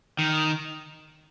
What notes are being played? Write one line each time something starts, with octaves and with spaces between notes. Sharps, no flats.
D#3